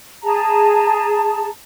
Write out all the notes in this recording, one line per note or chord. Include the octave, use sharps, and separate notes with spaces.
G#4 A5 A#5